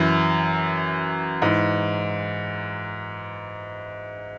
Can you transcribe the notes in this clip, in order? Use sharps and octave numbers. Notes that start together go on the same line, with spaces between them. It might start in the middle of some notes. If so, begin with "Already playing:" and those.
Already playing: F#2 E3
G#2 E3